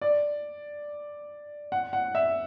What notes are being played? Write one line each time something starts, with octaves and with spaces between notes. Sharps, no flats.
D5
F#5
F#5
E5